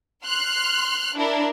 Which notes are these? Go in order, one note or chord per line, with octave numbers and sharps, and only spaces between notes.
C6 F6 F#6
D4 E4 A#4